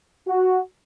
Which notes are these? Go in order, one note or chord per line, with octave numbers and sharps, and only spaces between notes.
F#4